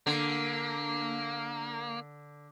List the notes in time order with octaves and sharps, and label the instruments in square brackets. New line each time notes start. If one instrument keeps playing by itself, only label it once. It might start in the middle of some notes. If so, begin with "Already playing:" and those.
[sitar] D3 [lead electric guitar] A#3